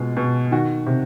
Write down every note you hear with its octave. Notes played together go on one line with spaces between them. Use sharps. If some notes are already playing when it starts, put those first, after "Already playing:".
Already playing: B2 G#3 F4
B2
D#3 F#4
C3